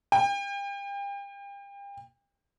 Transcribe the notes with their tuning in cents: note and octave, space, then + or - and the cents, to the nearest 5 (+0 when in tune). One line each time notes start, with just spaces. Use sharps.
G5 +35